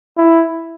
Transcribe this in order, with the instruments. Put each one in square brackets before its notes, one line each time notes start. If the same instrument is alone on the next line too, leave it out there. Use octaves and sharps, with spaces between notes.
[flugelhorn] E4